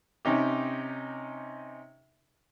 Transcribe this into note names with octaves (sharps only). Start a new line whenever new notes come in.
C3 C#4 D#4 G4